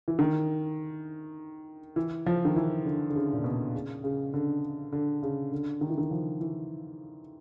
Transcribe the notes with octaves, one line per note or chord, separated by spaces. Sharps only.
E3
D#3
E3
F3
D#3
E3
D3
D3
C#3
A#2
B2
C#3
C#3
D3
D3
C#3
D3
D#3
E3
D#3
F3
E3